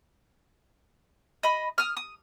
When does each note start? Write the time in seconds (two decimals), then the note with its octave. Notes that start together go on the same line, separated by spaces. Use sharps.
1.43 D#5 B5
1.78 D#6 F6
1.97 D#6